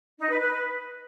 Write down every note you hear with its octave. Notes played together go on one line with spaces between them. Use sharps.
D#4
B4
B4